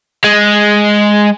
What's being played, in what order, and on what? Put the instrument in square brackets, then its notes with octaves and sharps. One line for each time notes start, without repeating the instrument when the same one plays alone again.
[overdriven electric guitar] G#3